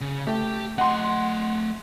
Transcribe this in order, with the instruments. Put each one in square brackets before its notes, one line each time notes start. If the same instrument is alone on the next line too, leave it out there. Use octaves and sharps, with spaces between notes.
[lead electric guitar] C#3
[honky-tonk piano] A3 [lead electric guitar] G4 G5
[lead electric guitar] A3 D#5 [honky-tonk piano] F#5 C6